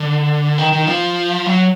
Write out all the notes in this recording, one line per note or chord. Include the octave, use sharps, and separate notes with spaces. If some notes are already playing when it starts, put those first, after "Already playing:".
Already playing: D3
D#3
D#3
F3
F#3